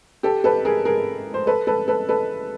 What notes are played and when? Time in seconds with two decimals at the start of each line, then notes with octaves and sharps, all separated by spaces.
0.23 G4 A4
0.44 A4 B4
0.65 G#4 A#4
0.85 G#4 A#4
1.34 C5
1.47 A4 B4
1.67 A4 B4
1.88 A4 B4
2.09 A4 B4